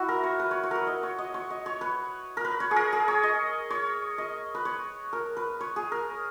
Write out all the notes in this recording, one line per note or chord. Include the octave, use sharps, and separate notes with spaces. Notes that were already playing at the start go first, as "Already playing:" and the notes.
Already playing: E4 F#4
A#4
C#5
B4
C#5
C#5
A#4 B4
D#5
C#5
D#5
C#5
D#5
C#5
B4
A#4
B4
C#5
G#4
A#4
G#4
C#5
D#5
C#5
D#5
B4
C#5
A#4
B4
C#5
G#4
A#4